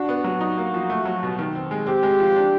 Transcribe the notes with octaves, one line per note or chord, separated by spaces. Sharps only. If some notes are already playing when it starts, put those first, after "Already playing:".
Already playing: D4 F#4
B3
F#3
D#4
A#3
F3
A3
F#3
B2
D#3
C4
G#3
C4 G4
G#3
F3
D4